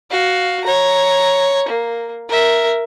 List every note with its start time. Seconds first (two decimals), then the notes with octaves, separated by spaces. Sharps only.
0.11 F#4 F5
0.65 C#5 A#5
1.68 A#3
2.29 A#4 E5